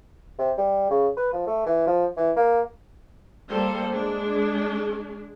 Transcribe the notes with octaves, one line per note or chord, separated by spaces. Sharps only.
C3
G3
C#3
B4
F3
A3
E3
F3
E3
A#3
G3 A#3 A4 C5
G#3 D4 G#4